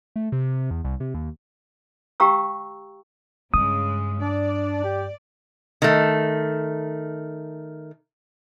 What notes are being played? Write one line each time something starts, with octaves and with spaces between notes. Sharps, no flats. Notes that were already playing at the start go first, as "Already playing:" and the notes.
A3
C3
E2
C2
C3
D#2
G4 F5 G5 A#5 C#6 E6
G2 C#3 G#3 D#6
D4 D5
G4
D#3 A3